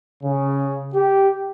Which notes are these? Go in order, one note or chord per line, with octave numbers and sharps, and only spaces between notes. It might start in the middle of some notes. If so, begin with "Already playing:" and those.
C#3
G4